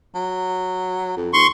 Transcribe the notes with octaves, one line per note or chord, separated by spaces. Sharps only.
F#3
F2
D#2 C6 C#6